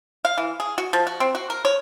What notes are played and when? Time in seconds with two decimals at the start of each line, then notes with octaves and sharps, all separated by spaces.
0.25 F5
0.38 E3
0.60 G#4
0.78 F#4
0.93 F3
1.07 F#4
1.20 C4
1.35 F#4
1.50 A#4
1.65 C#5